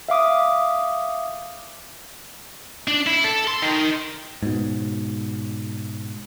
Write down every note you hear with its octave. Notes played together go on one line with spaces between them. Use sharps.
E5 F5 D6 D#6
D4
E4
A4
C6
D#3
G#2 B2